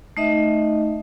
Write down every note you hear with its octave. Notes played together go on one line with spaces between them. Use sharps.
A3 D#4 D#5 E5